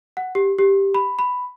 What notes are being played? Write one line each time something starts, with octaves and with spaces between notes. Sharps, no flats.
F#5
G4
G4
B5
B5